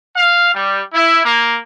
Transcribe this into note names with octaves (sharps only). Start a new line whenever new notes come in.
F5
G3
E4
A#3